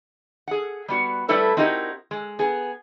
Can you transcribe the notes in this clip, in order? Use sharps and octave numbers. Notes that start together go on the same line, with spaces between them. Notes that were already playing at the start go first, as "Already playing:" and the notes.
G#4 F#5
G3 B3 F#4
G3 A3 C4 E4 A4 B4
C4 D#4 E4 F#4 G4 A#4
G#3
B3 G#4